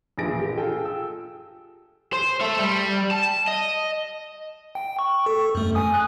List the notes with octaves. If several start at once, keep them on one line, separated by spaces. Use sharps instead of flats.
A1 A#2 F3 G#4 A#6 D7
G4
F4 G#4 A4 G5
E6
C5
A4 E5
G3
A5
D#5
G5
C#6
A4
F#2 A3
G#5 D#6
G#5 F#6